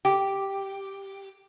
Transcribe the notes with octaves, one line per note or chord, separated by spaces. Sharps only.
G4